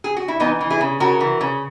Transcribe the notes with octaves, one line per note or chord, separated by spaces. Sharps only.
G#4
F#4
E4
E3 B3 D#4
E3
E4 G#4
C#3
C#3 F#4 A#4
E3
C#3